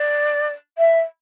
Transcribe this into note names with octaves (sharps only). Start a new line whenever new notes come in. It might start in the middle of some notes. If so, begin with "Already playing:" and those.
Already playing: D5
E5